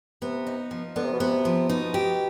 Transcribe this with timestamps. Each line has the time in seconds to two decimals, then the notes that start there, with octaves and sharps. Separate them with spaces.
0.22 C3 B3
0.47 D#4
0.71 F3
0.95 D3 B3
1.05 C3
1.13 B2
1.20 C3 B3
1.45 F3
1.69 B2 D#4
1.94 G4